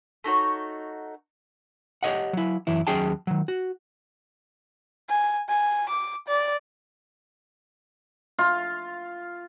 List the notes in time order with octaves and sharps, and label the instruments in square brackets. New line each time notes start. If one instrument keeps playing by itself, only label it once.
[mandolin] A3 D#4 F#4 C#5
[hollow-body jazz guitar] G4 C#5 D#5 F#5
F#3 E4
F#2 E3 E4
D#2 F#3 C#4 G#4 G5 A5
D#3 F#3
F#4
[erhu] G#5
G#5
D6
D5
[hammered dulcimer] F4